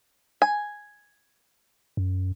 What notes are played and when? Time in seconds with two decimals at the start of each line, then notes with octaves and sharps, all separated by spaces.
0.42 G#5
1.97 F#2